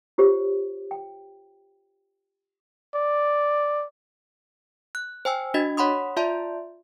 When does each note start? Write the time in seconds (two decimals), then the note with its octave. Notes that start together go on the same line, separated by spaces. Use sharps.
0.18 F4 G4 C5 C#5
0.91 G5
2.95 D5
4.95 F#6
5.25 C5 G5 G#5 E6
5.54 D4 F#4 D#5 A6
5.77 C#5 F#5 B5 C6 D#6
6.17 F4 D5 E5 A5 C6